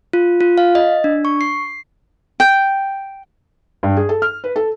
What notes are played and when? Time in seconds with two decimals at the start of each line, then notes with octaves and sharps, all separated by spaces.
0.13 F4
0.41 F4
0.58 F5
0.75 D#5
1.04 D4
1.25 C#6
1.41 C7
2.40 G5
3.83 G2
3.97 G#4
4.09 A4
4.22 F6
4.44 B4
4.56 A4